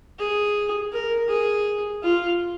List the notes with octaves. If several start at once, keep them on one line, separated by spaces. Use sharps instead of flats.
G#4
A#4
G#4
F4